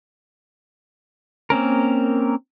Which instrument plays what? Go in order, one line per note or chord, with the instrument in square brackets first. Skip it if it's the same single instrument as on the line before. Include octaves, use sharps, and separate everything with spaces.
[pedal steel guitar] A#3 C4 C#4 A#4